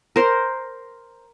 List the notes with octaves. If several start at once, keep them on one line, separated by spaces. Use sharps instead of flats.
A#4 C5